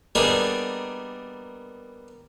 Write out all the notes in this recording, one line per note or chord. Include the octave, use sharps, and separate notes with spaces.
G3 A#3 B3 D4 D#4 G#4